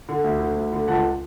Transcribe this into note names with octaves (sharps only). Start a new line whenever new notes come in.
D3
D2
D3
D2
D3
C#2 F#5 A5